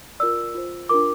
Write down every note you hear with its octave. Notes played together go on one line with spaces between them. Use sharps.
F4 A#4 D5 E6
F4 C5
D4 F4 A#4 D6